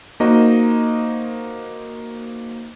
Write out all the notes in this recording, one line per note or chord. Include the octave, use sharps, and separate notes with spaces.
A#3 D#4 F#4 C5 D#5 A#5